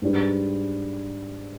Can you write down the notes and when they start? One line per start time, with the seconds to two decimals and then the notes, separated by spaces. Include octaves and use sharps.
0.02 G#2 G3 D4 G4 B4